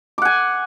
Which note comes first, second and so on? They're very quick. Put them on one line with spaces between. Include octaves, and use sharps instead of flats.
D6 F#5 G#5